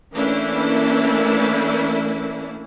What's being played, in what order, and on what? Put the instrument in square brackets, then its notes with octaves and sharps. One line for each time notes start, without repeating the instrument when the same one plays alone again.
[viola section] E3 A3 A#3 C#4 D4 E4